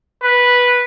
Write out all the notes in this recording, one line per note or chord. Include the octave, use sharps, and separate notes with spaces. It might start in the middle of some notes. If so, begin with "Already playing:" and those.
B4